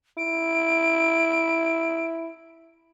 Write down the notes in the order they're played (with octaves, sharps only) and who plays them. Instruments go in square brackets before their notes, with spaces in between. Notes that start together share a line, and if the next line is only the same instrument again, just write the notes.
[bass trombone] E4 [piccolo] D7